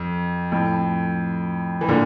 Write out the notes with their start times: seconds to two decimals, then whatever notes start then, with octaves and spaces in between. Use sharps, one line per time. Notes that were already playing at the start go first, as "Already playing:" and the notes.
Already playing: F2
0.52 F2 A2
1.81 E3
1.88 A#2 D3